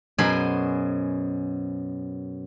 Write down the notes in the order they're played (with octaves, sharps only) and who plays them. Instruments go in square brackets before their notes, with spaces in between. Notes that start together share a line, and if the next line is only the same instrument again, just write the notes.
[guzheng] F#2 B2 G#4 C5 G#5 B5